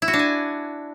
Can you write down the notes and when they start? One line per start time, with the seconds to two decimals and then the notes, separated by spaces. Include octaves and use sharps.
0.02 E4
0.08 F#4
0.13 D4
0.19 G#5